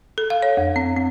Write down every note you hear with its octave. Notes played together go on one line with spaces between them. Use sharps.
A4
F5
C#5
F2
C4
C4